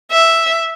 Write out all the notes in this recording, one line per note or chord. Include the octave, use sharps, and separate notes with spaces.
E5